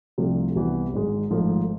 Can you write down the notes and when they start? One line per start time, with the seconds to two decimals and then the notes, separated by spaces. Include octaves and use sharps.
0.18 C2 C3 F3 A3 D4
0.55 C2 C3 E3 B3
0.93 G#1 G#2 G#3
1.30 G#1 G#2 F3 A3